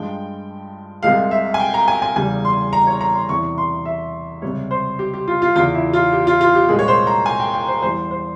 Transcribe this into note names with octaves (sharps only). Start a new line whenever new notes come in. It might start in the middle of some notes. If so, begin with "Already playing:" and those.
Already playing: G2 F3 G#3 G5
C2 C3 F3 G#3 F5
E5
G#5
G5
A#5
G#5
G#5
E2 C#3 G3 G#5
C6
A#5
C#5
A#5
C6
E2 C3 E3 C#6
C6
E5
C#2 C3 G3 C#5
C5
G4
G4
F4
F4
E2 C#3 E3 F4
E4
F4
G4
F4
F4
G4
C2 A#2 F3 G#3 G#4
C#5
C5
A#5
G#5
G5
G5
C5
E2 E3 G3 C5
C5